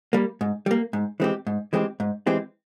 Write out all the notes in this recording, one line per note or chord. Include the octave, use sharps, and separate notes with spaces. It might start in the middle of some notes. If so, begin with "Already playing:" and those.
G3 A#3
G#2
G3 A#3
G#2
E3 G#3 C4 G4
G#2
E3 G#3 C4 G4
G#2
E3 G#3 C4 G4